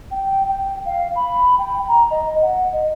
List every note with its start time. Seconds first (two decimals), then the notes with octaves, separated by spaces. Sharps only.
0.11 G5
0.48 G5
0.85 F5
1.16 B5
1.59 G5
1.88 A#5
2.11 D#5
2.42 F#5
2.72 D#5